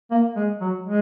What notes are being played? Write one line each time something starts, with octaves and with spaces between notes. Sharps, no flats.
A#3
G#3
F#3
G#3